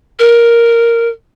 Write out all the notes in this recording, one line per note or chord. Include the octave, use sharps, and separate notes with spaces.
A#4